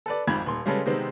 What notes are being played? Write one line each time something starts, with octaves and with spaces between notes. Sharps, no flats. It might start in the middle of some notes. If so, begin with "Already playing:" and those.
A4 B4 D5
G#1 F2 G#2 B5 G#6
D#1 C6
C#3 G3 G#3 C#4 A4 B4
C3 D#3 G#3 B3 C4